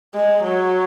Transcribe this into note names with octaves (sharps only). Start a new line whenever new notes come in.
G#3
F#3